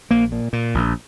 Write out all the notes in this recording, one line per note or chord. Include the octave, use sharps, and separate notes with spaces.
A#1 A#3
A#2
A#2
A#1